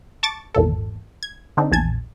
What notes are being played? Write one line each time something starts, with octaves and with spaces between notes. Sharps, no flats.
A5 C#6 D6 A6
G#1 E2 A#2 A4
G#6
D3 C4 D4 D#4
A#1 E2 G#5 A5 G#6